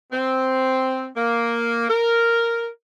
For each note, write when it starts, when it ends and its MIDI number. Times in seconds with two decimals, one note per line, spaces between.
0.12 1.06 60
1.16 1.87 58
1.88 2.67 70